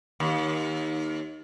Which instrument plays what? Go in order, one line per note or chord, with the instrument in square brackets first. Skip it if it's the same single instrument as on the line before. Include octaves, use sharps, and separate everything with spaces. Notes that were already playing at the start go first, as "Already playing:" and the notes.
[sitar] D#2